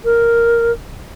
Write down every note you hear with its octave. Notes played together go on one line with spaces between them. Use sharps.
A#4